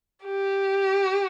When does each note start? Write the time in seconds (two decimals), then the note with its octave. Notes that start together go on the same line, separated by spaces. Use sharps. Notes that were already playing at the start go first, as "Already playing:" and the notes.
0.24 G4